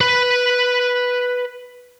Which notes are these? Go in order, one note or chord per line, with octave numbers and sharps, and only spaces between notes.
B4 B5